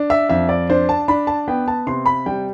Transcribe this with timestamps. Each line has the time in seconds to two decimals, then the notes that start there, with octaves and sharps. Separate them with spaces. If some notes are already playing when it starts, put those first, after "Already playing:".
Already playing: D4
0.10 E5
0.29 F2 E5
0.49 D5
0.70 D4 C5
0.89 A5
1.08 D4 B5
1.27 A5
1.48 B3 G5
1.68 A5
1.87 C3 C6
2.06 B5
2.26 G3 G5